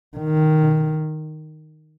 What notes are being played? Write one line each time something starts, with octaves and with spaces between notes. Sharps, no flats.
D#3